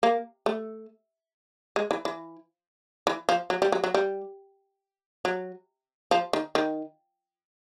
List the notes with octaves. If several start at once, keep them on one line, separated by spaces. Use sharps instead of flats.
A#3
A3
G#3
E3
E3
E3
F3
F#3
G3
F#3
F#3
G3
F#3
F3
D#3
D#3